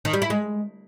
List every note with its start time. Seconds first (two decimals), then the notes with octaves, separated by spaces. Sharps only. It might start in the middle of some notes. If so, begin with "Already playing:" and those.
0.05 D#3
0.13 G3
0.22 E4
0.30 G#3